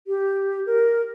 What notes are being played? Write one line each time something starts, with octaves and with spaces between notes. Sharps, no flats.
G4
A#4